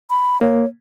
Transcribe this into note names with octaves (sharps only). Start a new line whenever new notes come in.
B5
A#3 C#5